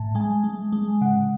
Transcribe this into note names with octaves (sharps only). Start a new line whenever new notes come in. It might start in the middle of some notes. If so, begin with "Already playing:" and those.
Already playing: A2 A5
G#3 G#5
G#3
G#3
C#3 F#5